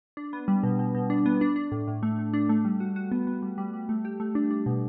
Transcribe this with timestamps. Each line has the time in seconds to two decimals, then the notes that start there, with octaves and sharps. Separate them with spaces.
0.17 D4
0.33 B3
0.48 G3
0.63 B2
0.79 B2
0.95 B2
1.10 D4
1.26 B3
1.41 D4
1.56 D4
1.72 A2
1.88 A2
2.03 A3
2.19 A3
2.34 D4
2.49 A3
2.65 G3
2.80 F#4
2.96 F#4
3.12 B3
3.27 B3
3.42 G3
3.58 G3
3.73 G3
3.89 A3
4.05 G4
4.20 A3
4.35 D4
4.51 D4
4.66 B2